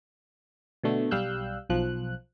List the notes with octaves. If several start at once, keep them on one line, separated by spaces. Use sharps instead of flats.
B2 D3 A3 B3
B1 G3 F5 E6 F#6 G6
B1 F3 F#6